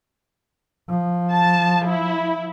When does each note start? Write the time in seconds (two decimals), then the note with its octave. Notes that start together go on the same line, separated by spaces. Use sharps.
0.90 F3
1.32 A5
1.87 E4